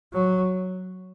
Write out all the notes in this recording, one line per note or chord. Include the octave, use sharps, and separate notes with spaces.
F#3